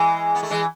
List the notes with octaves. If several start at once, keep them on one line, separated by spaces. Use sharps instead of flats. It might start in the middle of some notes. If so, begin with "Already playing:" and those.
Already playing: E3 G#3
B3
A3
E3 G#3